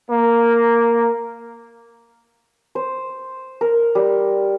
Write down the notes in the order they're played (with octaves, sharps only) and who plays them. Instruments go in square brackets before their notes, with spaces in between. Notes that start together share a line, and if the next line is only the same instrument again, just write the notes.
[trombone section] A#3
[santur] C5
A#4
G3